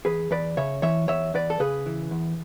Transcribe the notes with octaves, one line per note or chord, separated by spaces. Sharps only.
E2 G#4 B4
E2 B4 D5
C#3 C#5 E5
E3 C#5 E5
E2 C#5 E5
E2 B4 D5
A4
C#3 G#4 B4
E3
E2